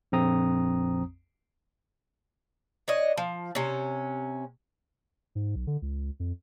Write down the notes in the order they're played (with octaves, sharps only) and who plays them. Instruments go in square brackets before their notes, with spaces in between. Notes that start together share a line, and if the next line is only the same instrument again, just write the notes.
[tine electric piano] A#1 F2 C4 A#5 D#6
[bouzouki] D4 C#5 D#5
F3
C3 C#4
[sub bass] G#2
B1
D3
C#2
F2